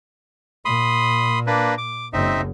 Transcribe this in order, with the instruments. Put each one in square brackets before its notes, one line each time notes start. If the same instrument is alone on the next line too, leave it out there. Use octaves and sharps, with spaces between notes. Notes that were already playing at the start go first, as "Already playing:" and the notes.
[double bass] A#2 [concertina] B5 C6 D#6
[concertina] A#3 D4 B4
D6
[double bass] F#1 [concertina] C4 D#4 E5